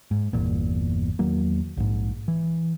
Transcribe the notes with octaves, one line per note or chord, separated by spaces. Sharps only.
G#2
G1 E2 A#2
E2 D#3 F#3 A#3
A#1 G#2
E3